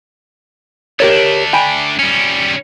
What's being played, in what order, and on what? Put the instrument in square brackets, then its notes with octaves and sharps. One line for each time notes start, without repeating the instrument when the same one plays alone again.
[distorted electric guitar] A3 D4 [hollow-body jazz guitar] G4 A#4 C#5
[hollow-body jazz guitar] G5 G#5 B5
[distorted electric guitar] G3 C#4